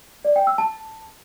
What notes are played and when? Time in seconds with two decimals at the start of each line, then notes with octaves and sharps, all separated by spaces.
0.25 D5
0.36 G5
0.47 E6
0.58 A5